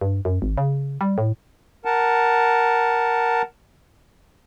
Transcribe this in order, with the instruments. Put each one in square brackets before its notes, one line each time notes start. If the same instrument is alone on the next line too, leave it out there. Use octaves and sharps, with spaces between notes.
[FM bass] G2
F#2
G#1
C#3
G3
A2
[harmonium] A#4 F#5 A5